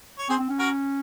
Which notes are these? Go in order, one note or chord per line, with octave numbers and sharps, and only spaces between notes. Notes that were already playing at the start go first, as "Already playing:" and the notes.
C#5
C4 G#4 C5
C4
C#4
F#4 A#4